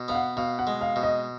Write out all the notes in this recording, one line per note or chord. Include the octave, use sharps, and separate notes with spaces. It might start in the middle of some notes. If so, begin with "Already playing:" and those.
Already playing: B2
B3 F5
F#5
B2 F5
F#5
G#3
F5
B2
D#5